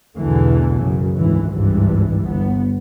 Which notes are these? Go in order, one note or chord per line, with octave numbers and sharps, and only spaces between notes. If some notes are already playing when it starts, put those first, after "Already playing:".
B1 E2 B2 D3 E3 A3
F#2 C#3
G#1 D2 G#2 E3
G#1 C#2 G2 E3 G3
G1 B3